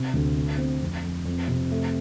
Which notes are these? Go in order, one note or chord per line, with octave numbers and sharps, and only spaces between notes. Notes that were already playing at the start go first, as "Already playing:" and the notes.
Already playing: C3
D2
A3
C4
F2
F2
F2
C3
A3